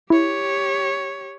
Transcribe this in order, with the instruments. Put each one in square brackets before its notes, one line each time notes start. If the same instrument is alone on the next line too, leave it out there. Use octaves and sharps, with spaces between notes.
[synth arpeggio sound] E4 [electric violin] G4 C#5